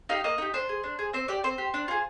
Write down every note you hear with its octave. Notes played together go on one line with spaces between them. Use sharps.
D#4 G4 F5
A#3 D#5
D#4 G4
D4 C5
G#4
D4
G#4
C4 C5
G4 D5
C4 C5
G4
D4
F4 G#4